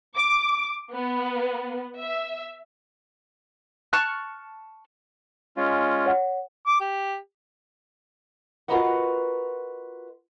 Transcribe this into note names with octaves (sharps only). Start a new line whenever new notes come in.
D6
B3
E5
A5 C#6 F6 F#6
G#3 C#4 F4
C#5 F#5
D6
G4
F4 F#4 A#4 B4 D#5 F#5